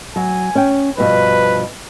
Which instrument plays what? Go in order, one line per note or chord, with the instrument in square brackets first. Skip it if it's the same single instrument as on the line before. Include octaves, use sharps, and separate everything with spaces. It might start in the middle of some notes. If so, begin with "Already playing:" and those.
[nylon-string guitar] F#3 [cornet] G#5
[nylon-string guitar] C#4 G5
[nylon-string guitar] G2 B2 F3 [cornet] B4